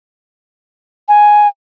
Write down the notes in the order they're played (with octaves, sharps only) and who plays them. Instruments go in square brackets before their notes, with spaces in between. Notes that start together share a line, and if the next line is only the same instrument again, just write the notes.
[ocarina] G#5